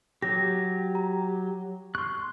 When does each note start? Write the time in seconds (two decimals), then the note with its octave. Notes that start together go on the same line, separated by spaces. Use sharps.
0.22 F#3 G4 A#6
0.95 A#5
1.95 C6 C#6 F#6